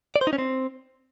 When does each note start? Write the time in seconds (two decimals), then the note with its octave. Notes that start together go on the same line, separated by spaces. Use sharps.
0.16 D5
0.21 C5
0.27 D#4
0.33 C#4
0.38 C4